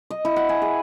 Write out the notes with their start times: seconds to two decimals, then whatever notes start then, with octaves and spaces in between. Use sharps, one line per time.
0.11 D#5
0.25 E4
0.36 F#5
0.49 G#5
0.62 G#4